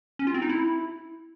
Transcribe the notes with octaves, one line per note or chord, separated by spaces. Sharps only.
C#4
F4
C4
D#4
E4